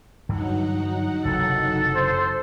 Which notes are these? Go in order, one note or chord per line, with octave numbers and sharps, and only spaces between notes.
G2 D3 E3 F#3 D#4 F#5
F#1 C3 E3 A4
C5